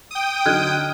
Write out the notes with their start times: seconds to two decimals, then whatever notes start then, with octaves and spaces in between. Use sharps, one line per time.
0.11 G5 D#6
0.46 D3 F#3 D#4 F6 F#6 G#6